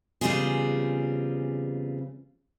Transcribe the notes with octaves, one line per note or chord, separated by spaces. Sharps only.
E2 C#3 G3 C4 F4 G#4